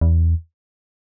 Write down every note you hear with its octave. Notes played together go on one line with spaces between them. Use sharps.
E2